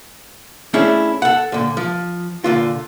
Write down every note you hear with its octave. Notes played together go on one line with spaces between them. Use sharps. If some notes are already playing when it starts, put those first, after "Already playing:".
A3 C#4 D4 E4 G#4 C#5
A4 F#5
A#2 D3
F3
A#2 D3 F4